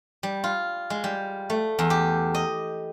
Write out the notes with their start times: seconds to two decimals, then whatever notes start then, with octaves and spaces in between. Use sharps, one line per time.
0.23 G3
0.44 F4
0.90 G#3
1.04 G3
1.50 A3
1.79 E2
1.90 G4
2.34 D#5